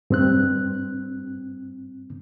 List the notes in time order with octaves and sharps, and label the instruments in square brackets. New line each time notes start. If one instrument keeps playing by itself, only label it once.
[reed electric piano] G2 C4 F#6